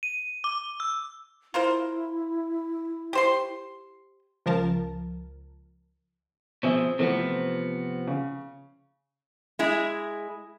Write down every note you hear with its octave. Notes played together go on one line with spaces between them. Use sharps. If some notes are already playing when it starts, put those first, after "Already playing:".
D#7
D6
E6
E4 F4 A#4 C5
G4 C5 C6
C#2 F3 A#4 A5
B2 F3 C4 G#4 E5
C3 E3 F3 A3 B3 C4
C#3
G#3 E4 G#4